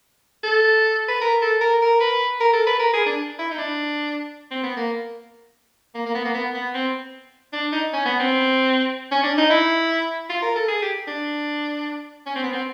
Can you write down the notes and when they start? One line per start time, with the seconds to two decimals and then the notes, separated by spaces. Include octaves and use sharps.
0.43 A4
1.08 B4
1.21 A#4
1.42 A4
1.61 A#4
1.82 A#4
2.00 B4
2.40 A#4
2.53 A4
2.66 B4
2.79 A#4
2.93 G#4
3.06 D4
3.39 E4
3.50 D#4
3.58 D4
4.51 C4
4.63 B3
4.77 A#3
5.95 A#3
6.06 A#3
6.14 B3
6.25 A#3
6.34 B3
6.54 B3
6.74 C4
7.53 D4
7.72 D#4
7.93 C#4
8.05 B3
8.19 C4
9.11 C#4
9.23 D4
9.38 D#4
9.50 E4
10.30 F4
10.42 A#4
10.56 A4
10.68 G#4
10.82 G4
11.07 D4
12.26 C#4
12.36 C4
12.43 B3
12.53 C4